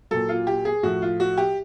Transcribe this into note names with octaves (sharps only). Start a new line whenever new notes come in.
A#2 F#3 A4
F4
G4
G#4
A2 F3 F#4
F4
F#4
G4